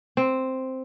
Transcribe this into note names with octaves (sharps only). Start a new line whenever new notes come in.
C4